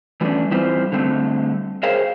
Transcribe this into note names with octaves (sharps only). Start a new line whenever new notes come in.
E3 G3 A3 C#4 D4
E3 G3 C4 E4 F4 C5
D3 G3 A3 C4
G#4 A#4 C5 C#5 F5 G5